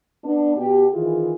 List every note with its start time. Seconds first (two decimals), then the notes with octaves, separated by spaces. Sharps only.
0.24 B3 D4
0.57 B2 G4
0.94 D#3 E3 E4 F4 G#4